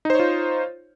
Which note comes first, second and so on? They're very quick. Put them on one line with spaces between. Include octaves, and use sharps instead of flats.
D#4 C5 C#5 F4